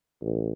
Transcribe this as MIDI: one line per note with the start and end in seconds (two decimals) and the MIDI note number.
0.21 0.52 33